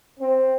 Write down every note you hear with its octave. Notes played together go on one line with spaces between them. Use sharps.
C4